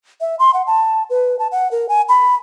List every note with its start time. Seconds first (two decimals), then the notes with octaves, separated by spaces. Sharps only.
0.21 E5
0.39 C6
0.54 F#5
0.67 A5
1.10 B4
1.39 A5
1.51 F#5
1.71 A#4
1.89 G#5
2.09 B5